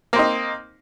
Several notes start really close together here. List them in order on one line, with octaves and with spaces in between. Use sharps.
A#3 C4 D#4